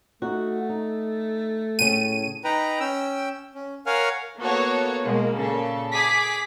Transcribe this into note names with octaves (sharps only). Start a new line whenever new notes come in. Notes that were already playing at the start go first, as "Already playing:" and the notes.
A3 D#4 F#4
D#4
A2 C#3 C#4 D#7
D#4 B4 G5 A#5
C#4 G5 E6
C#4
A#4 C#5 F5 F#5 G#5 F6
A#3 B3 F#4 A4 C#5
B2 G#3 A#3
A#2 C#3 A4
G#4 D6 B6